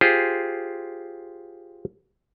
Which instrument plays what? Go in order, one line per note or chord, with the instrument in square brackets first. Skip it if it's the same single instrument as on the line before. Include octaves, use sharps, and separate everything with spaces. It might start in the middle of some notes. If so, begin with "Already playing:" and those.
[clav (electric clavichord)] F4 G4 G#4 C5